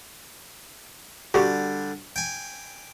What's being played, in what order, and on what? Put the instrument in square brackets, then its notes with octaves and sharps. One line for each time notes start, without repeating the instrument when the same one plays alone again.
[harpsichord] D3 G3 [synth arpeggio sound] F#4 G4
[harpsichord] G5 G#5